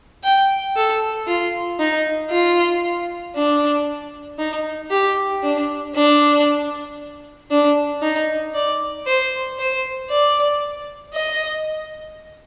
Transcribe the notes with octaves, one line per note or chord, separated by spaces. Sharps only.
G5
A4
F4
D#4
F4
D4
D#4
G4
D4
D4
D4
D#4
D5
C5
C5
D5
D#5